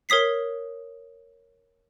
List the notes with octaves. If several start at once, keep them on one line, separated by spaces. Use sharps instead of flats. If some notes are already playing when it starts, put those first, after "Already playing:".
A#4 C#5 D#6 B6 C7